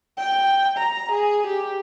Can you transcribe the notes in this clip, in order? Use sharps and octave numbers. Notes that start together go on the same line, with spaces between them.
G5
A#5
G#4
G4